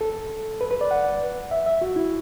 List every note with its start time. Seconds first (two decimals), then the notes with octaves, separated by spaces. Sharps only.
0.01 A4
0.61 B4
0.71 B4
0.81 D5
0.91 F#5
1.51 E5
1.66 E5
1.82 F#4
1.96 E4